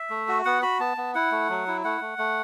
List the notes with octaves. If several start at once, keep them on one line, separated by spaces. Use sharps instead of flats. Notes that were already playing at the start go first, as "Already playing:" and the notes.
Already playing: E5
A3
F#4
B3 F#5
F#4 B5
B3 A5
B3
E4 F#5
A3
F#3
E4
A3 F#5
A3
A3